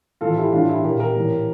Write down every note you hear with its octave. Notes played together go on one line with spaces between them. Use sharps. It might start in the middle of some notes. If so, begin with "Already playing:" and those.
A2 E3 F4 A4
E4 G4
A2 E3 D4 F4
E4 G4
A#2 G4 A#4
G4 A#4
A2 E3